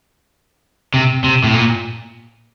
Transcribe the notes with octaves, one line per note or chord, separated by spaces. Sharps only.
C3
C3
A2
A#2